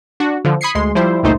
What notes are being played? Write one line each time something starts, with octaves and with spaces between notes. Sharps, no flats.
D4 F#4
D3 F3
B5 D#6 G#6 C7 C#7
D2 G#3 C6
F3 G3 E4 C5
G1 C#2 A#2 A3 D#4 C5